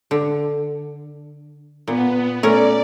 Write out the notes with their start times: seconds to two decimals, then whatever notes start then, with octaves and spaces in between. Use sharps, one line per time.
0.11 D3
1.88 A#2 B3
2.43 A3 C#4 A#4 D5